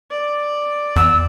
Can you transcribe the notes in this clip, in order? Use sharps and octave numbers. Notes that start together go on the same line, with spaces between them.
D5
E2 E6